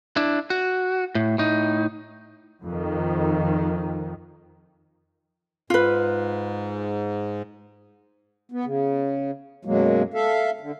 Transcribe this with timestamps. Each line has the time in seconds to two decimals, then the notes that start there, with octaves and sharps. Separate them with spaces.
0.17 D4 E4
0.50 F#4
1.15 A2
1.38 A2 D#4
2.63 F2 D#3
5.70 G#2 F4 B4
8.52 B3
8.65 C#3
9.65 F#2 B2 F#3 G#3 A#3
10.14 A4 E5 F5
10.60 D3